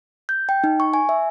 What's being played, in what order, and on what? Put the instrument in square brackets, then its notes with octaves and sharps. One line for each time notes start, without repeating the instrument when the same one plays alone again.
[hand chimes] G6
G5
D#4
C#6
G#5
E5